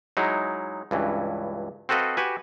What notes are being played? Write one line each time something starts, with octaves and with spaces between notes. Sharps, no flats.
F#3 G#3 D#4 E4
C#2 G2 E3
C4 F#4 A4 B4 D#5 F5
F#4 G4 B4 G#5